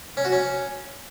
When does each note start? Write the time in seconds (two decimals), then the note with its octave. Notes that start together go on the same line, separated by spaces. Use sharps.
0.17 C#4
0.25 F#4
0.32 C#4